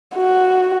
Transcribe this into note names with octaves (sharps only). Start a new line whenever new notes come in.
F#4